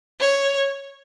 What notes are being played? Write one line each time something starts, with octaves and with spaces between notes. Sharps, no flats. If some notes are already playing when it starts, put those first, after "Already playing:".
C#5